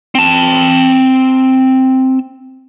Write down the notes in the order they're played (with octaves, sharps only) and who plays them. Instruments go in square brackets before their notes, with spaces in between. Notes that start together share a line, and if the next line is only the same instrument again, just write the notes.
[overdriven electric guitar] C4 A5